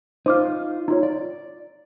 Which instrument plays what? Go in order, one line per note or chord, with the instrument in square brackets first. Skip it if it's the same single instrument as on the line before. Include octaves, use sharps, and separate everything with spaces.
[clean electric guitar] D#4 F4 [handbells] C5 D6 F6
[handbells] D#4 F4 C#5
[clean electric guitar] D5